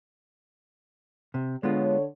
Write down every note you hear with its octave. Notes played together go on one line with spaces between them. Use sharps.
C3
D3 G#3 B3 F4 C#5